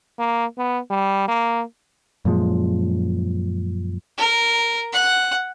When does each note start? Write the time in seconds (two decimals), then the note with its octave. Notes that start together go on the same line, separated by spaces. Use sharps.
0.19 A#3
0.58 B3
0.91 G3
1.28 A#3
2.25 F#2 A#2 F3 G#3
4.18 A#4
4.93 F#5